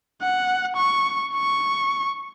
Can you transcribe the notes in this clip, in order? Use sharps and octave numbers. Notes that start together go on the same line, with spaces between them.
F#5
C#6
C#6